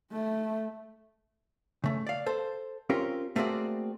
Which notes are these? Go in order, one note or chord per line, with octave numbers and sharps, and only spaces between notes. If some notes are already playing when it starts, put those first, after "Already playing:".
A3
C#3 A3
D5 F5
A4 C5
C4 C#4 F4 G4 A#4
A3 A#3 C4 F#4 G#4 D5